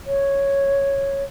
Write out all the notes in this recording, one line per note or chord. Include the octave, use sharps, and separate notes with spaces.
C#5